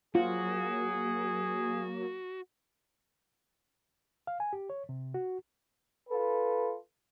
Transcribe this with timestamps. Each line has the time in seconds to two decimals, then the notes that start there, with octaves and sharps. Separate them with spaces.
0.15 F#3 A#3 F4 F#4 G#4
4.27 F5
4.40 G#5
4.53 G4
4.70 C#5
4.89 C3
5.14 F#4
6.09 F4 A4 B4